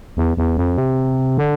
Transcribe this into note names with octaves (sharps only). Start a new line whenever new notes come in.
E2
E2
F2
C3
D3